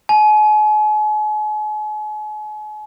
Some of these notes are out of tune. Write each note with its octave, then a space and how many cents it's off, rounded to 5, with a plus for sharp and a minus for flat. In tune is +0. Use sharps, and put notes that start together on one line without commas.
G#5 +40